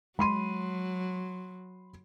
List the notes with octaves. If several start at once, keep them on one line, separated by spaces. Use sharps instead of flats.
F#3 G#3 B5 C6 D#7